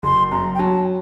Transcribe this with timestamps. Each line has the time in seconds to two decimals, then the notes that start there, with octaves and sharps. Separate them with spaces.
0.03 F#1 C6
0.32 F#2 A#5
0.55 G5
0.59 F#3 A5